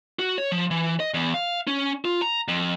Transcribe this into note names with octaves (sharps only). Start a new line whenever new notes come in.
F#4
C#5
F3
E3
D#5
E2
F5
C#4
F4
A#5
F2